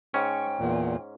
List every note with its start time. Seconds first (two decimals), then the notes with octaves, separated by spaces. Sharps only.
0.14 G#2 C#4 G5 C#6
0.60 E2 A#2